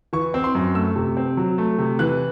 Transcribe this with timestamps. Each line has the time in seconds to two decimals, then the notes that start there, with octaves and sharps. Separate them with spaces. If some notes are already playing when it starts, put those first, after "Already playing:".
0.13 E3 C#6
0.34 C4
0.44 C6
0.55 F#2
0.75 A3 E6
0.96 C3
1.17 C4
1.37 F#3
1.58 A3
1.79 C3
1.99 E3 F#6